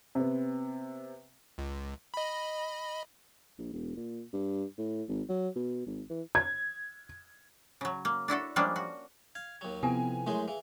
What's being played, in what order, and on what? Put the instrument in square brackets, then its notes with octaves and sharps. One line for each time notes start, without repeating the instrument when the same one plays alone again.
[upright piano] C3 B3
[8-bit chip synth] C#2
D#5 B5
[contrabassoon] A#1
E1
A#2
G2
A2
G#1
F#3
B2
G#1
E3
[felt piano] G#6
[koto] C#3 F#3
A#3
D4 E4 F#4 A4
F3 G3 G#3 A#3 C#4 D4
F#4
[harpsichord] F5 [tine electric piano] G#6
[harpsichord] D#2 F#3
[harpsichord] F2 [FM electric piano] C3 B3 [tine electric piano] E4 [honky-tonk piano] G#5
[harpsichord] F#2 G#3 C5 [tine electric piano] A3 E4 C#5
[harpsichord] E3 [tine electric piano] G#4 F5